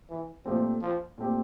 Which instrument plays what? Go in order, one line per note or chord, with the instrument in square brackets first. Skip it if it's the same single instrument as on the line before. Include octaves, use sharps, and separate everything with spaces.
[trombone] E3
[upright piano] A#2 A3 C4 G4 [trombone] F3
[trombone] F3
[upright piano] A#2 A3 C4 G4